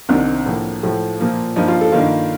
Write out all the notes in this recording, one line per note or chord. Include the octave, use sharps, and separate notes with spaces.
C2 C3 D#3 D4
A2 F3 A#3
A2 F3 A3
A#2 F3 A#3
G2 F3 A#3 D#4
F4
A4
G2 D#3 A#3 F4